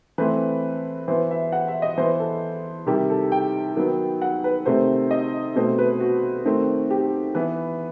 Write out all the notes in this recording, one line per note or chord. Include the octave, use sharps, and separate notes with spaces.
E3 A3 C4 B4
E3 B3 C5
E5
F#5
E5
D#5
E3 B3 C5
A4
C3 D#3 G3 G4
A4
G5
D#3 F#3 B3
F#5
B4
C3 D#3 A3 C4 C5
D#5
B2 A3 C4 C5
B4
F#4
D#3 A3 C4
G4
E3 B3 B4